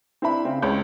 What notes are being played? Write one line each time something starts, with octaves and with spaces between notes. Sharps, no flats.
C4 D4 E4 E5 B5
C#3 C4
C#2 C#5 G6